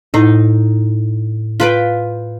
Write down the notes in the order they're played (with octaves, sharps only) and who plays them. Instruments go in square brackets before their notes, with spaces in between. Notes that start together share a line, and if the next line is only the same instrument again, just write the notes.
[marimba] A2 E4 [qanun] D#4
[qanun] F4 B4 G5